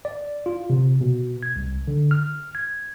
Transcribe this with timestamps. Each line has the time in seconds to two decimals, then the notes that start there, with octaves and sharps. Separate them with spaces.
0.05 D5
0.46 F4
0.70 C3
1.01 B2
1.43 G#6
1.56 C2
1.88 D3
2.11 F6
2.55 G#6